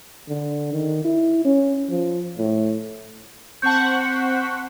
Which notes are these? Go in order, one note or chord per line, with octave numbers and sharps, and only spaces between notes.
D3
D#3
E4
C#4
F3
A2
C4 C5 F#5 A5 C#6 G6 B6